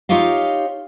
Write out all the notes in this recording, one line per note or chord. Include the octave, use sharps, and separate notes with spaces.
D#4 F4 G4 C#5 D#5 F5